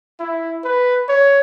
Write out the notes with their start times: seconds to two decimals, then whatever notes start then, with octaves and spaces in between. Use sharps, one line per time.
0.20 E4
0.64 B4
1.08 C#5